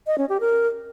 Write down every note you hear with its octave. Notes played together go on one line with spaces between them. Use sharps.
D#5
C#4
G4
A#4